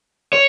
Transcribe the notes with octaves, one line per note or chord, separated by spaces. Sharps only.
C#5